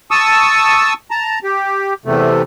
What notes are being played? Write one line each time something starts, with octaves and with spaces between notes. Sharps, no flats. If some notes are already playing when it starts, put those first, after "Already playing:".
A5 C#6 D#6 E6
A5 A#5
G4
E2 C3 A3